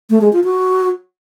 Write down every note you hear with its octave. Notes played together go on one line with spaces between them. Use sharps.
A3
G#3
F4
F#4